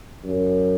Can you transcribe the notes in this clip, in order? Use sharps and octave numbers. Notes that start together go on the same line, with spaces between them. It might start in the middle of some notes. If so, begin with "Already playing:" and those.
F#2